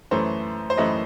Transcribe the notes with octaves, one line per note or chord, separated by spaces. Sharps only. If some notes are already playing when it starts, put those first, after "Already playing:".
F#2 E3 A3 C5
C5
F#2 E3 A3 B4 D#5